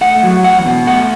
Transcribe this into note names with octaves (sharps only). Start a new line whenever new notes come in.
A3 F#5
F#3
E2 F#5
B2
A3 F#5